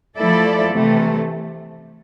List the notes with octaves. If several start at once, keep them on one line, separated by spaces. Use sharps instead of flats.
F3 A3 E4 A4 D5
C3 E3 A3